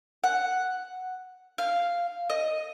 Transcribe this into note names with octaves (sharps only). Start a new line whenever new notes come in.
F#5
F5
D#5